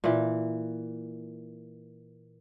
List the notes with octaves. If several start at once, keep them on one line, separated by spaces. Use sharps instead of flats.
A#2 E3